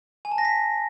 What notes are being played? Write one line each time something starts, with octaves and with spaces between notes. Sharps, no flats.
G#5
A5
A#6
B6